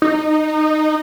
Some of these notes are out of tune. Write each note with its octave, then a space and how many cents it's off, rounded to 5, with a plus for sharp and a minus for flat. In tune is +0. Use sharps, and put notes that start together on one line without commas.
D#4 -15